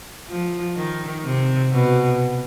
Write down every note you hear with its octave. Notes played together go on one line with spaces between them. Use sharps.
F3
D#3
C3
B2